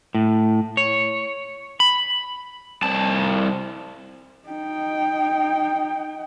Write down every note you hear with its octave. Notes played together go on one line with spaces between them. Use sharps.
A2
C#5
B5
C2 A5
D#4 G5